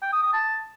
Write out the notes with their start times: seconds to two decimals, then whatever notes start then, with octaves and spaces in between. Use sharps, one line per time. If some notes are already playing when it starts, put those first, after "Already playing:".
0.02 G5
0.13 D#6
0.23 D#6
0.33 A5